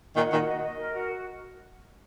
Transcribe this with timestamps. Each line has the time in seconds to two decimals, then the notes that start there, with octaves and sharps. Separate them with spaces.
0.16 A#2 D#3 F#5
0.31 A#2 D#3 F#4
0.47 D#5
0.62 D#5
0.77 A#4
0.93 F#4